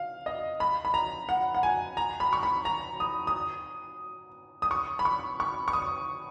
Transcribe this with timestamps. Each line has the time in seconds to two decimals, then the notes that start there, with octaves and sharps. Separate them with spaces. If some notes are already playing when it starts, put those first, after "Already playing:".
Already playing: F5
0.26 D#5
0.60 B5
0.85 B5
0.94 A#5
1.29 F#5
1.55 F#5
1.63 G#5
1.97 A#5
2.20 B5
2.33 C#6
2.43 B5
2.65 A#5
3.00 D#6
3.27 D#6
4.62 D#6
4.71 C#6
4.99 B5
5.05 C#6
5.40 C#6
5.68 C#6
5.73 D#6